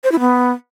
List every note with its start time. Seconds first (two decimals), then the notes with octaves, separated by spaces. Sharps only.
0.04 C5
0.12 E4
0.20 B3